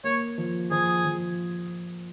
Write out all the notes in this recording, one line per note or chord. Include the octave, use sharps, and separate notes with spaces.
A#3 C#5
F3
F3 G#4
F3